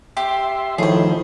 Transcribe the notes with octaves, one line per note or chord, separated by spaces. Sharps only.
G4 E5 C6
A2 D#3 F3 G#4 C5